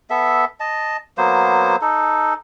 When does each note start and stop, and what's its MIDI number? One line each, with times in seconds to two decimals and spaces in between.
0.10 0.45 59
0.10 0.45 69
0.10 0.45 76
0.60 0.97 75
0.60 0.97 81
1.18 1.76 54
1.18 1.76 58
1.18 1.76 59
1.18 1.76 72
1.81 2.34 63
1.81 2.34 69